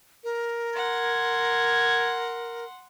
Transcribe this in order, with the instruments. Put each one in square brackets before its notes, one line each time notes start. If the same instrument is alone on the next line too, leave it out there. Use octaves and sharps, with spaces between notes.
[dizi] A#4
[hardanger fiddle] F#5 C6 [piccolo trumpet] G#6